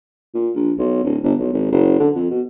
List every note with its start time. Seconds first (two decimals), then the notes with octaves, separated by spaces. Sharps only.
0.35 A#2
0.56 A#1
0.79 B1
1.04 D1
1.23 G1
1.39 B1
1.53 G#1
1.72 F#1
2.00 D3
2.16 F2
2.31 B2